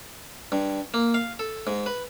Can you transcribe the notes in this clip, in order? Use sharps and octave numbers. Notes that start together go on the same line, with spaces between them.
G2
A#3
F5
A4
G#2
B4